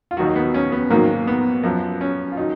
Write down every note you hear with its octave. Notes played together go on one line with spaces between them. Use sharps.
F4
D#2 D#3 F#3 F#4
D#4
B3
C#4
B3
G#2 D#3 F#3 A#3
B3
F#2 F3
C#4
F4
D#3 F#3 D#4